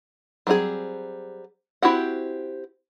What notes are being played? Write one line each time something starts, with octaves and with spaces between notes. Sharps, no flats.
F#3 G3 C4 F4 G#4
C4 E4 F#4 G4 F#5